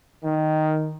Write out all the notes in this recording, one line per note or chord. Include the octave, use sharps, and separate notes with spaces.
D#3